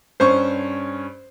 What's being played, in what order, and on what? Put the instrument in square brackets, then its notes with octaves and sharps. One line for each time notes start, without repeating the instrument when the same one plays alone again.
[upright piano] G2 C#4 C#6 [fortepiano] C5